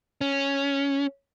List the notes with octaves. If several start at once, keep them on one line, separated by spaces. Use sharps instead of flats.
C#4